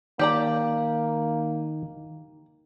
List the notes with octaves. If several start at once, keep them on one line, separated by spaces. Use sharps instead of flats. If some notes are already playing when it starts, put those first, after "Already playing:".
D#3 A#3 G4 D5 A#5